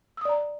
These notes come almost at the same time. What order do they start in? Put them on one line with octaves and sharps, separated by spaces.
E6 D#6 D5 A#5